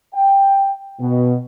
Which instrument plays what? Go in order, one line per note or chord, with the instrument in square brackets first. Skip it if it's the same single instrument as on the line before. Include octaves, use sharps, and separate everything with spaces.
[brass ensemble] G5
B2